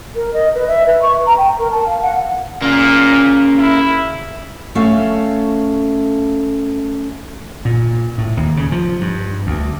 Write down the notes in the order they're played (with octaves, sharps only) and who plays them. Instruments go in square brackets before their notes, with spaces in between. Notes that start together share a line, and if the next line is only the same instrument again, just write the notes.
[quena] A#4
D#5
B4
E5
B4
C#6
A#5
G5
A#4
A5
F5
F#5
[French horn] A#2 [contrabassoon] C#3 [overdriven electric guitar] A#3
[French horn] E4
[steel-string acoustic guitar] A3 C#4 A4 F5
[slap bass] A#2
A2
D#2
C#3
F3
G2
D2